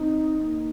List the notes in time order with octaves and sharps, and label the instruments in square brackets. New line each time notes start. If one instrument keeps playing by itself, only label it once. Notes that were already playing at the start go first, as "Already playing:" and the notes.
Already playing: [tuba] C4 [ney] D#4
[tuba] A#3